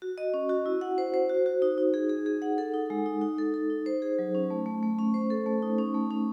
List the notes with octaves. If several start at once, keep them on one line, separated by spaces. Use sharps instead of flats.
F#4
D#5
C#4
F#4
E4
F#5
C5
C5
F#4
F#4
D#4
D#4
G#4
G#4
G#4
F#5
A4
D#4
G#3
D#4
D#4
A4
A4
D#4
C5
G#4
F#3
C#4
A3
A3
A3
C#4
C5
A4
A3
D#4
C#4
A3
C#4